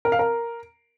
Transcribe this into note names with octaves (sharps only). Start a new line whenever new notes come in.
A#4
F5
A#4